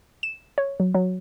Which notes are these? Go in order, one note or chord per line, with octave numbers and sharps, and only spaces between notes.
E7
C#5
F#3
F#3